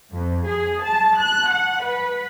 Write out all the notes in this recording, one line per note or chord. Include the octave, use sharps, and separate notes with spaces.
F2
G#4
A5
F#6
F#5
B4